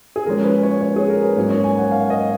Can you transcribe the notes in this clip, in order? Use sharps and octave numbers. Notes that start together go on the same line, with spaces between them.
G#4
A#2 F3 G#3 C#4 A#4
B4
C#5
C#5
G#4
A#4
B4
G#2 F#3 A#3 C#4 C#5
C#5
G#5
F#5
F5
D#5